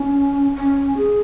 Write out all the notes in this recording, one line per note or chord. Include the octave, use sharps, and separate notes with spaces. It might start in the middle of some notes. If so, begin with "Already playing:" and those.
Already playing: C#4
C#4
G#4